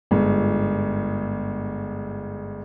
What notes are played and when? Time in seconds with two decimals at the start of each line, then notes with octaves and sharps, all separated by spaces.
0.11 G1 G#2